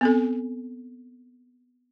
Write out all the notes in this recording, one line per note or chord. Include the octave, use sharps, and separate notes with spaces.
B3 C4 A4